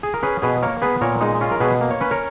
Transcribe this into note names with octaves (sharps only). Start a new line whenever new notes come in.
G#4
A#4
C#4 G#4 B4
B2 G#4 B4
A#3 A#4 C#5
B3 G#4 B4
A#2 A#4 C#5
G#3 D#4
C#4 F4
A#4
B2 G#4 B4
A#3
C#5
C#4 B4
A#4 C#5